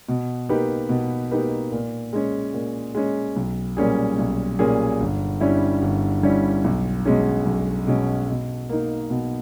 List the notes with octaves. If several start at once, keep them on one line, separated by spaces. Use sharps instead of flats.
B2
A#3 D#4 G4 B4
B2
A#3 D#4 G4 B4
A#2
G#3 C#4
A#2
G#3 C#4
B1
A#2 G3 C#4 G#4
B1
A#2 G3 C#4 G#4
G1
G2 G3 C#4 E4
G1
G2 G3 C#4 E4
B1
B2 G#3 C#4
B1
B2 G#3 C#4
B2
A#3 D#4
B2